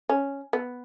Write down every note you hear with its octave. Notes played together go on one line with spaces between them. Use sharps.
C#4
B3